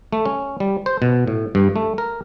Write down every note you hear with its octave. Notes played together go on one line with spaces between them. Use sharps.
A3
C#4
G3
C5
B2
A2
G2
A3
A#4